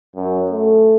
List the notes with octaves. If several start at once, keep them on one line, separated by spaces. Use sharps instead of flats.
F#2
A3